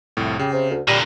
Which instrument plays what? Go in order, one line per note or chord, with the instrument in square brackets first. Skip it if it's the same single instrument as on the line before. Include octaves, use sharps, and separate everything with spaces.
[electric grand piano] C2 F2 A2
[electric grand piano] C#3 [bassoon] G4
[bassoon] C3
D2
[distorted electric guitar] A#2 D3 [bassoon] G3 [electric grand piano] A#6